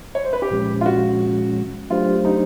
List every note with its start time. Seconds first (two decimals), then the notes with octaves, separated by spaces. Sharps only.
0.15 C#5
0.24 C5
0.33 B4
0.42 G4
0.51 A#2 F3 G#3 C#4
0.81 F4
0.86 F#4
1.90 F#3 A3 D4 F4 G4 C5
2.25 D#4